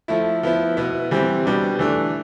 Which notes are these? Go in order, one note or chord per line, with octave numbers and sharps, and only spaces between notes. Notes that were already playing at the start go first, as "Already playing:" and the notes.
F3 A3 E4
F3 B3 E4
B2 B3 E4
E3 G3 C4
B2 G3 B3 D4
E3 A3 D4